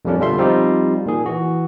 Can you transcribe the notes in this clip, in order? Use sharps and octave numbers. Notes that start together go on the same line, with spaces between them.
F2 A#2 G3 A#3 C#4 D4
B2 D3 G3 F4 E5 C6
F3 G3 C4 D#4 F4 G4
A#2 D#3 G#4
E3 F#4